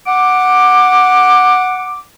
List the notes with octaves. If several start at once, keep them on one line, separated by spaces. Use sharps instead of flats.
F#5 D6